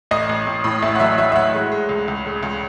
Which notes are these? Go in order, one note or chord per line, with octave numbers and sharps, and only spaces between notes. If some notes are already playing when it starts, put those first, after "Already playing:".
A1 D#5
A1
A1
A2
A1 E5
F#5
F#3 E5
F#3 E5
E5
A1 F#5
G#3
G#3
C#2
C#2
C#3
C#2